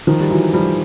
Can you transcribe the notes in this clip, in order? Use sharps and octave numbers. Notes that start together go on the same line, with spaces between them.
D#3 F3
G3
E3 F#3
F3 G3